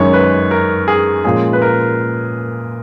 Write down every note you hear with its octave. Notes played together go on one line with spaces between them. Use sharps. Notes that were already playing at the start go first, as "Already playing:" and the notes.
Already playing: F#2 D#3 G#3 C#4 C#5
B4
A#4
G#4
A#2 F3 G#3 C#4 G#4
B4
A#4